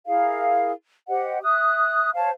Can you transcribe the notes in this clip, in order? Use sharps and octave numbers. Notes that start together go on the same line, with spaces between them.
E4 G#4 A#4 F5
G4 C5 D#5 F#5
E5 D#6 F#6
C5 C#5 F5 A5